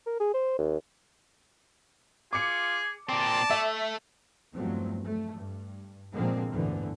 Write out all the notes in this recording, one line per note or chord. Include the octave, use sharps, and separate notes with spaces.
A#4
G#4
C5
D#2
F4 G#4 D6 C#7
A#2 C4 D5 A5
A3 E5
E2 G2 F3 F#3 A3 C4
A3
G2
A#2 D3 F3 G#3 A#3 C4
G1 D2 A2 D3 E3